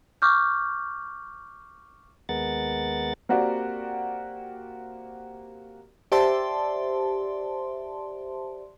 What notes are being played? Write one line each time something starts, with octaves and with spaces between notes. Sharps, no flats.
C#6 D6 F6 G6
D#2 G#3 B3 A#4 F#5 A6
A#3 C4 F#4 G4 A#4 D5
G4 C5 D5 E5 A5 C6